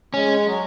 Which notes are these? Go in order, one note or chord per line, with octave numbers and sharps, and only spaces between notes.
G#3 C#4
F#3